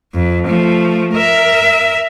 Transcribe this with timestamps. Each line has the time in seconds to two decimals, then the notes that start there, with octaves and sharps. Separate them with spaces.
0.14 F2
0.47 F3 A3
1.14 A#4 E5